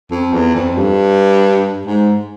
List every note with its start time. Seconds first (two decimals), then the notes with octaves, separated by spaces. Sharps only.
0.11 F2
0.33 E2
0.55 F2
0.77 G2
1.87 G#2